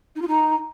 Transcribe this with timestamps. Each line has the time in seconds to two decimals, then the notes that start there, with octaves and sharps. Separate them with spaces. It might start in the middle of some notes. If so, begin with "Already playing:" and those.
0.16 D#4
0.22 F4
0.28 D#4